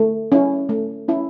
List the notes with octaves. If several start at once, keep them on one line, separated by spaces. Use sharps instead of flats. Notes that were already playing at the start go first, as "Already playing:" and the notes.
Already playing: A3
C#4 E4
A3
C#4 E4